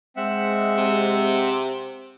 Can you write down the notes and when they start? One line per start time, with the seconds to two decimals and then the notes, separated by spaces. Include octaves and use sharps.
0.16 G#3 C4 E5 F#5
0.78 C3